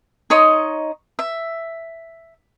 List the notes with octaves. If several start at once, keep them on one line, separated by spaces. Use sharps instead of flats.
D#4 C#5 D#5 C6
E5